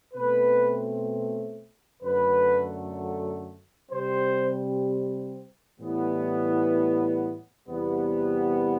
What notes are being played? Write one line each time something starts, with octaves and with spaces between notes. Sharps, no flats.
B2 A3 C4 B4
F#2 D3 F#3 A3 B4
C3 G3 C4 C5
A2 E3 G3 B3
E2 C3 G3 B3